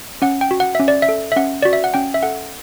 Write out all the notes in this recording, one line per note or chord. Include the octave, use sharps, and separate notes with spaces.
C#4 F#5
G5
F#4
F#5
C#4 E5
D5
E5
A4
E5
C#4 F#5
F#4 D5
E5
F#5
C#4 G5
E5
A4 F#5